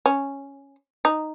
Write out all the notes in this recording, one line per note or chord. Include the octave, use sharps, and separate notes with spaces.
C#4
D#4